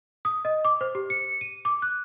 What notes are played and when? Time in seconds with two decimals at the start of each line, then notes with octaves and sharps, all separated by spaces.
0.25 D#6
0.45 D#5
0.65 D6
0.81 C5
0.95 G4
1.10 C#7
1.41 D#7
1.65 D6
1.82 F#6